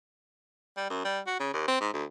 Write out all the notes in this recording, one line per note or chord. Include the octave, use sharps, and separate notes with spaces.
G3
F#2
G3
F#4
C#3
D#2
C4
G#2
D2